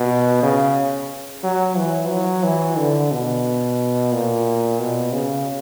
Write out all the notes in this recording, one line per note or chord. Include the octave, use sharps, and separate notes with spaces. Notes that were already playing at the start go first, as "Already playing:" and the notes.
Already playing: B2
C#3
F#3
E3
F#3
E3
D3
B2
A#2
B2
C#3